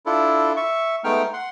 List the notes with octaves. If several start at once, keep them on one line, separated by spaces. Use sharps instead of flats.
D4 E4 F4 A4
E5 C#6
G#3 A3 B3 D#4 G5 F6
F#5 C6